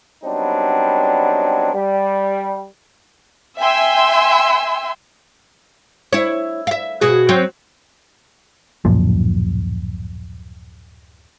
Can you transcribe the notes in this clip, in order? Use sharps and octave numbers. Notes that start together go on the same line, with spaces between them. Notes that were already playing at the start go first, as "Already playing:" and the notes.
F#3 G3 B3 C4 D4 D#4
G3
E5 G5 G#5 C6 E6
E4 C#5
E5 F5
B2 F#4 G#4
F#3 C4
D1 F#2 A#2 F3